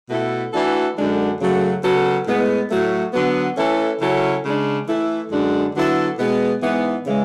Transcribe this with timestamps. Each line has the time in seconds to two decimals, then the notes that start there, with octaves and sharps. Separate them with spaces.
0.09 B2 A3 E4 A4
0.52 E3 A3 D4 F#4 A4
0.96 F#2 D3 G#3 D4
1.40 F#2 C#3 F#3 A3
1.83 C#3 F#3 B3 F#4 A4
2.27 A2 G#3 B3
2.70 A2 F#3 A3
3.13 D3 F#3 B3
3.57 E3 A3 C#4 E4 A4
4.01 C#3 F#3 C#4 E4 A4
4.44 C#3 G#3 D4
4.87 E3 A3 E4
5.31 F#2 D3 G#3 D4
5.75 D3 F#3 B3 E4 A4
6.18 B2 G#3 B3
6.61 G#2 E3 B3
7.06 C#3 E3 G#3